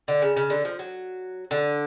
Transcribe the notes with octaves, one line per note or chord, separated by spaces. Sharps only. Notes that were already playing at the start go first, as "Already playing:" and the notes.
D3
C#3
C#3
D3
F3
F#3
D3